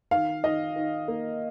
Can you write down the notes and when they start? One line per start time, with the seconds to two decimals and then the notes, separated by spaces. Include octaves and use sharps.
0.11 D#3 F5
0.44 D#3 D#5
0.76 D#3
1.08 A#3